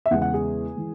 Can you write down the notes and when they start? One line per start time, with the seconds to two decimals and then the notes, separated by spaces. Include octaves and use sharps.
0.06 E5
0.11 E2 C#3 G#3 F#5
0.22 F#5
0.34 G#4
0.76 E3 G#3